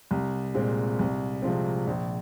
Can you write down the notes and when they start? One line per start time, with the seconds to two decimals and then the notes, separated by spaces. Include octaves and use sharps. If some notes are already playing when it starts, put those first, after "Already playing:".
0.11 C2
0.54 A#2 G#3 C4
0.99 C2
1.42 C3 F3 G#3 C4
1.87 A#1